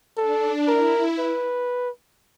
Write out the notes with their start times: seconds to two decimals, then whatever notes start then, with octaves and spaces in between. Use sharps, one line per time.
0.17 D4 A4
0.67 E4 A#4
1.18 B4